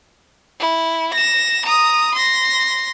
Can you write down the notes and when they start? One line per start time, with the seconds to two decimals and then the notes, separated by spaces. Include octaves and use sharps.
0.60 E4
1.13 A#6 E7
1.65 A#5 D#6
2.14 C6 A#6